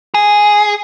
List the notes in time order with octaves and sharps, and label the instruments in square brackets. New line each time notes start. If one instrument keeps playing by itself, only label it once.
[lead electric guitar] G#4